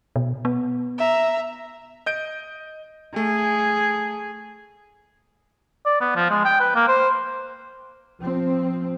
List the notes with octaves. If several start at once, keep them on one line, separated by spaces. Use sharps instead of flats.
B2
B3
E5 A#5
D#5 G6 D7
A3 G#4
D5
B3
F3
G#3
G5
B4
A#3
C5
F3 C4